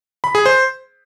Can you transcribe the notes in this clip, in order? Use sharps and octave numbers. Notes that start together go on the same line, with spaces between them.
B5
G#4
C5